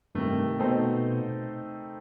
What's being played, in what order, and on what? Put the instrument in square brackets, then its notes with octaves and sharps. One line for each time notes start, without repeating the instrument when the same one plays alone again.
[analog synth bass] G2 [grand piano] C3 D#3 A3
[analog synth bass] B2 [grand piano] A3 C4 D#4 A4 C5